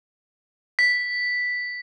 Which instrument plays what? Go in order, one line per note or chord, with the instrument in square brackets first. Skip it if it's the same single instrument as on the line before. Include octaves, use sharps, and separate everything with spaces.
[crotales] B6